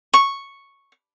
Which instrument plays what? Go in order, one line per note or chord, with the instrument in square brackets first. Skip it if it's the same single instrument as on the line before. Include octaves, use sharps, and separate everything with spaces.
[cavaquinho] C#6